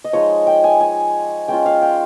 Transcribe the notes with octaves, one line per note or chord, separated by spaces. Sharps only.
D#5
F3 G#3 D#4 C#5
G5
G#5
G#5
G#3 C#4 F4 G5
F5
G5